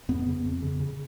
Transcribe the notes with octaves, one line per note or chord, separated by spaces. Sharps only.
F2 B3
C#3
F2
C#3
C#3